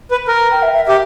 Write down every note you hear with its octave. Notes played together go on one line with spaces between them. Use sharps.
B4
A#4
G5
E5
E5
E5
G4